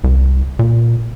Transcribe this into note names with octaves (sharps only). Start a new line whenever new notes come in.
C2
A#2